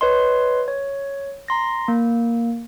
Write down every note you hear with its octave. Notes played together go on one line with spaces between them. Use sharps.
B4 C#5 D#5 C6
C#5
A#5 C6 A#6
A#3